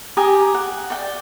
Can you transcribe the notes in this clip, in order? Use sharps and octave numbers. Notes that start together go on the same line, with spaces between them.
G4 G#5 A#5 D#6
F#5
D5 G5